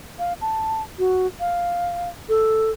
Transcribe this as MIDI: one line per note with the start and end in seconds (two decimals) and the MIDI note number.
0.19 0.33 77
0.41 0.82 81
0.99 1.27 66
1.40 2.09 77
2.29 2.71 69